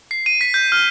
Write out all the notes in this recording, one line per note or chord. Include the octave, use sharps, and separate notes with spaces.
C7
D#7
B6
G6
F6